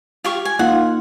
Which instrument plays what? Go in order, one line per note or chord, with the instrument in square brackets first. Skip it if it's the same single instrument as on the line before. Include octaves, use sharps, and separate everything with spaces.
[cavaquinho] F4 G4 C#6
G#5
[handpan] A#3 D#4 F4 [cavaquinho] F#5